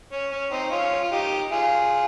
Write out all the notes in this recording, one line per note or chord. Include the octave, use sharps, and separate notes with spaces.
C#4
C#4
C4 D#4
C#4 F4
F4
D#4 G4
F4 G#4